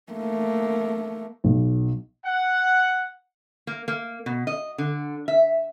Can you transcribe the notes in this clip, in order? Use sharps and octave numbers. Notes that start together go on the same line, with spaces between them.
A3 A#3
B1
F#5
A#3
A#3
B2
D#5
D3
E5